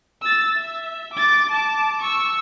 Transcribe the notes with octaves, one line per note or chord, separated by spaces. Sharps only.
E6 A6
E5
D6 A6
A5 D6
C#6 E6